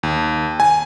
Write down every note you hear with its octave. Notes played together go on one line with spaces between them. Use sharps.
D#2
G#5